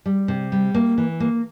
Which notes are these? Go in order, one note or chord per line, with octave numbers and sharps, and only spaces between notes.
G3
C3
G3
A#3
E3
A#3